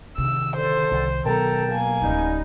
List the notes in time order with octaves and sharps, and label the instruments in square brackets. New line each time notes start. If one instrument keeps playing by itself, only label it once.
[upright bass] C3 D#3 [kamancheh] E6
[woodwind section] D3 A4 [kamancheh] C5
[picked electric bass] C2
[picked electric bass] B2 F#3 B3 [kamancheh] A4 A#5 [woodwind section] A#4 G5 A5
[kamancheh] A#3 G#5
[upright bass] D1 F3 [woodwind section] G3 C#4 D#4